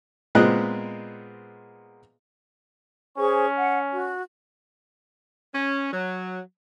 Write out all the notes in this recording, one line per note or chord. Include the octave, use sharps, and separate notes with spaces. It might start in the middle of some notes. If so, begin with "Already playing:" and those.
A#2 G#3 B3 C4 D#5 F#6
C#4 G#4 C5 C#6
F#5
F#4
C#4
F#3